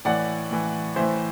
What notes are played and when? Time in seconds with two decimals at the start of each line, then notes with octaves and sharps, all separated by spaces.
0.05 A2 E3 D5 F#5
0.51 A2 E3
0.96 A2 E3 C5 E5